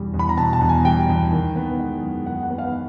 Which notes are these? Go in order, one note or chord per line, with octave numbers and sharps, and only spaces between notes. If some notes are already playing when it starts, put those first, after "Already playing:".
Already playing: E2 B2 G3
E2
B5
A#5
B2 A5
A5
E2
G#5
G3 G5
E2
D#3
B3
G#3
F#2
D#3 F#5
F#5
B3
F5